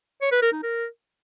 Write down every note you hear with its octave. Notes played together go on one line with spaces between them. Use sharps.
C#5
B4
A#4
D#4
A#4